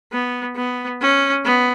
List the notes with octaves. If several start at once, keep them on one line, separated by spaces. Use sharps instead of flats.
B3
B3
C#4
B3